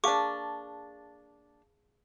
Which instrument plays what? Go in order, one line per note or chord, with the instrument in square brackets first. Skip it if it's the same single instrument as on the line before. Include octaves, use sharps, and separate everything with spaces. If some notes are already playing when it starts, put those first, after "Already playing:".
[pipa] A#3 D4 [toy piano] G#4 F5 A5 [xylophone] C#6 D6